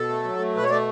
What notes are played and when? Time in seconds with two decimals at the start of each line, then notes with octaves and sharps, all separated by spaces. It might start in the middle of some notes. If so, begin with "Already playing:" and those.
Already playing: B2 A4
0.09 A3
0.23 F#3
0.39 A3
0.55 B2 B4
0.63 C#5
0.69 A3 D5